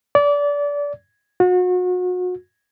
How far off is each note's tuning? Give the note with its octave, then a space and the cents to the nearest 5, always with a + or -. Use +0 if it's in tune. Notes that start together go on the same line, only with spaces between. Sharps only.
D5 -25
F#4 -35